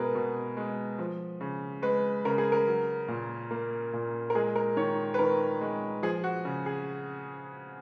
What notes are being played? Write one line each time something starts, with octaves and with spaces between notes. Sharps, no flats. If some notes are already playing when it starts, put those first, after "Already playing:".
Already playing: B2 G#3 G#4 A#4 B4
B2
G#3
F3
C#3
G#3 B4
C#3 A#4
G#4
A#4
F#3
A#2
A#3
A#2
A#4
G#3 G#4
A#4
D#3 C#5
B4
D#3 A#4
G#3
F3 G#4
F#4
C#3
G#4